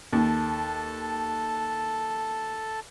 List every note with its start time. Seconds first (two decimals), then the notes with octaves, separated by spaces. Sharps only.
0.13 D#2 A4 A5